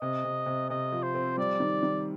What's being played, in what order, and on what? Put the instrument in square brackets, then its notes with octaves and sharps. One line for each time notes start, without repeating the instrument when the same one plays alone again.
[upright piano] C3 [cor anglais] D#5
[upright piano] C3
C3
[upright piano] C3 [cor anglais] D#5
[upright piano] F3
[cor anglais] C5
[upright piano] C4
[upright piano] G3 [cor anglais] D5
[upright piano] D#3
D#3